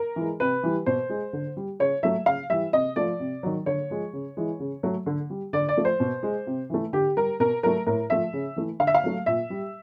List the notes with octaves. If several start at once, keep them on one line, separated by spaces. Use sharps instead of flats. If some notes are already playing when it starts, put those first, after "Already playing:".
Already playing: A#4
E3 G#3
C3 B4
E3 G3
B2 C5
G#3
D3
G3
C#3 C#5
F#3 A3 E5
C#3 F5
E3 G3 E5
C3 D#5
F3 A3 D5
C3
D#3 F#3
D3 C#5
F3 G#3
C#3
E3 G#3
C#3
F#3 A3
D3
G3
D3 D5
D5
F3 A3
C5
B2
G#3
C3
E3 A3
D3 G4
G3 A#4
B2 A#4
F#3 A3 A#4
A2 A#4
F3 A3 E5
C#3
E3 A3
D3 F5
E5
F5
F#3 A3
A#2 E5
G3